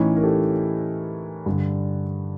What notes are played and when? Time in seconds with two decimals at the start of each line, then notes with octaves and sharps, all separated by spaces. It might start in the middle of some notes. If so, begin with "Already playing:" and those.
Already playing: A2 E3 C#4 D#4
0.16 A#4
0.23 G4 A4
1.46 G2 D3